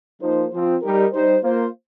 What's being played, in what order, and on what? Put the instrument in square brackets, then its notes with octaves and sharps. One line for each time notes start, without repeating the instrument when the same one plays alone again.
[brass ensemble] F3 A#3 D#4 C5
F3 C4 F4 C5
G3 D#4 G4 A#4
G3 D#4 C5
A#3 F4 C5